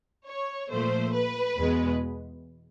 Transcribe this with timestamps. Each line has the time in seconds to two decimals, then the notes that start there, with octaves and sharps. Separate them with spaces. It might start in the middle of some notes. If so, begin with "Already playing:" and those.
0.27 C#5
0.71 A#2 F3 A3 C5
1.13 B4
1.57 E2 B2 G#3 B3